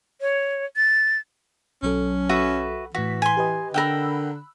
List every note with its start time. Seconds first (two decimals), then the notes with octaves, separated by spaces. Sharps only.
0.21 C#5
0.76 A6
1.83 B1 F#3 C#4 A4
2.29 F#4 B4 E5
2.95 A2 E3 F#4 B6
3.22 G#5 C6
3.37 G4 B4 D#5
3.74 D3 A#4 F#5 G5 B5 E6 F#6